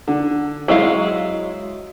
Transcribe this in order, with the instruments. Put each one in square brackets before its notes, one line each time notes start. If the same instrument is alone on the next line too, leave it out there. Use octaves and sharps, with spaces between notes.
[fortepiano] D3
[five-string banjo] F#3 G#3 F5 [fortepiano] E4